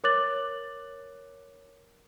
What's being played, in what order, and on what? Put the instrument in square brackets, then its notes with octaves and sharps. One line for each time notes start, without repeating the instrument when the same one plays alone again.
[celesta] A#4 C#5 D6 F#6 A6 F#7